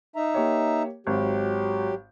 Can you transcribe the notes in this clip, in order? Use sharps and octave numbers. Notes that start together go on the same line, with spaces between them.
D#4 E5 A#5
A#3 G4 C#5
G#1 F#3 G4